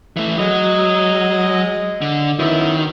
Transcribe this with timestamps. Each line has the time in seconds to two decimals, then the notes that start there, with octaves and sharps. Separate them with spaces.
0.17 E3 A3
0.39 F#3 G#3 D#5
2.02 D3
2.39 F#2 D#3 B3 E4